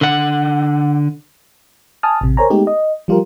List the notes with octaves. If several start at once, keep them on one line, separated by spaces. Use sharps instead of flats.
D3 F#5
G#5 A5 D#6 F6
A1 C3
A#4 C5 C#5 G#5 A#5
G#3 A3 B3 D#4 G4
D#5
F3 G3 F4 G4 A#4